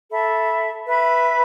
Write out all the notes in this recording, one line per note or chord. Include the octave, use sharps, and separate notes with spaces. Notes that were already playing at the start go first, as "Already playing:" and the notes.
A4 E5 B5
B4 E5 B5